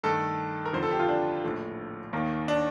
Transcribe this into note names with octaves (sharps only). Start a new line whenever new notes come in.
G2 D#3 A3 A4
A#4
F1 F2 D3 F3 C5
A4
G4
F4
D4
A#1 A2 F3 A3
D#2 D#3 A#3
D4